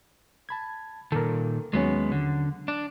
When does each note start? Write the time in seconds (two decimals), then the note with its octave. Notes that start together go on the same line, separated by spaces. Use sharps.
0.49 A5 B5 G#6
1.12 A#2 D#3 A4 A#4
1.73 D#2 F#3 G#3 B3 C#4
2.12 D3
2.68 D4